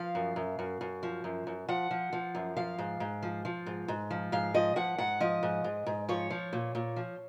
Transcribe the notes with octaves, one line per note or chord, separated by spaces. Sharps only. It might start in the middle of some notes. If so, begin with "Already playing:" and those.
Already playing: F3 F5
F#2
F#2
F#2
F#2
F3
F#2
F#2
F3 F#5
F3
F3
F#2
F3 F5
G#2
G#2
F3
F3
G#2
G#2
F3
G#2 F5
F3 D#5
F3 F#5
G#2 F#5
F3 D#5
G#2
G#2
G#2
F3 C#5
F3
A#2
A#2
F3